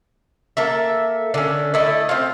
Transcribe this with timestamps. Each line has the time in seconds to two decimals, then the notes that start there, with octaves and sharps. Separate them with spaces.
0.57 A#3 A4 E5
1.34 D3 C#4
1.74 A3 E4 D#5
2.09 C4 F4